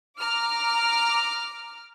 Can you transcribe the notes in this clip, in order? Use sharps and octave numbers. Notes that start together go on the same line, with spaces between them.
A#5 D6 F6